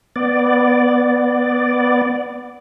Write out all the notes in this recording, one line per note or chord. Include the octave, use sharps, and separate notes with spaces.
B3 D5